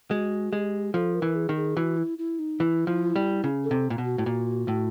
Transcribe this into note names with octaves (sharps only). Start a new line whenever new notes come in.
G#3 F#4
G#3 G4
F3 A4
A#4
E3
G#4
D#3
G#4
E3 F#4
E4
E4
D#4
E3 E4
F3
G3
C#3
A4
C3
A#2
B2
F#4
A2
A#2
A2